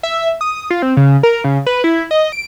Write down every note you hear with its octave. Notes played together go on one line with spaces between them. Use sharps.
E5
D#6
F4
C4
C#3
A#4
C#3
B4
E4
D#5
D7